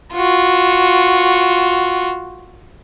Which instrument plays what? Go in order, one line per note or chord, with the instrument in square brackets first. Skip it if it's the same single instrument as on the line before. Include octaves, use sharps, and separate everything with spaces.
[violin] F4 F#4